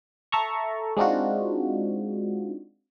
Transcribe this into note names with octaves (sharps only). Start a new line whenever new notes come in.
A4 E5 A5 A#5 C#6
G#3 C4 D4 D#4 F4 F#4